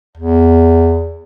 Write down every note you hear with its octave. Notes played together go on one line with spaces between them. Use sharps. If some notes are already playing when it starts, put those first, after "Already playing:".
E2